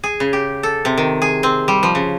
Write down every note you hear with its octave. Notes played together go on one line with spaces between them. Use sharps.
G#4
C#3
G4
A4
C3
D#3
G#4
C4
G3
F3
C#3